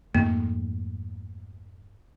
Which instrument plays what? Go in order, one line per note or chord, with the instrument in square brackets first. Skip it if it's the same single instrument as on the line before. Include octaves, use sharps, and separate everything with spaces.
[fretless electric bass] F2 G#2 A3 [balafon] A#3